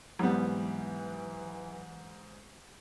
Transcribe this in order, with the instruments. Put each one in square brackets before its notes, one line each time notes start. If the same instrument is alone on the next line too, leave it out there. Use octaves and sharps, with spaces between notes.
[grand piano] G#2 [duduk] E3 [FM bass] F#3 [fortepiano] G3 B3